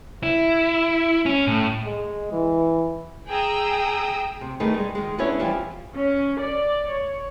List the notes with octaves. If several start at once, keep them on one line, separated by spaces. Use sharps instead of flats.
E4
C#4
A2
G#3
E3
G#4 G5 A#5 D#6 E6
C3
D#3 A3 D#4 G#4 B4 D#5
G3 G#3
D#3 G#3
B3 C#4 D4 E4 B4 C#5
E3 F3 G3 G4
C#4
D5
C#5